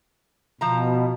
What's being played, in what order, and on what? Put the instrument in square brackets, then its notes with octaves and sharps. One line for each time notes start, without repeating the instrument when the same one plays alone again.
[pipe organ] B2 [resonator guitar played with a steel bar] F3 A#5